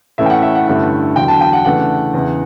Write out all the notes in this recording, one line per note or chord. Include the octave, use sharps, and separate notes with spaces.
A2 E3 A3 C#4 E4 E5
G5
F#5
E5
F#5
G2 D3 A3 C#4 E4 F#5
E2 D3 F#3 G5
A5
G5
F#5
C#3 E3 A3 D4 F#5
E2 C#3 E3